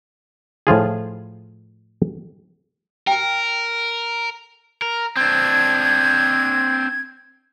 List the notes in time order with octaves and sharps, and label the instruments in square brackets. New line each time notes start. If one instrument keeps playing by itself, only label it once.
[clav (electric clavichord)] A2 F3 F4 G#4
[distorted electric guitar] A#4 [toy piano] G5 G#5
[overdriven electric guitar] A#4
[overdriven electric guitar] C4 D4 [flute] G#6